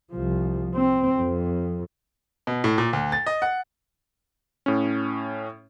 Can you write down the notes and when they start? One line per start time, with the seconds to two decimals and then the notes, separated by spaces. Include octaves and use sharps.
0.11 C2 F3
0.75 C4
1.18 F2
2.47 B2
2.64 A2
2.78 A#2
2.93 D2
3.12 A6
3.26 D#5
3.42 F#5
4.66 A2 C#4